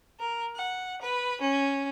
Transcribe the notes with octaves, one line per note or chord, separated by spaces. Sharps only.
A#4
F#5
B4
C#4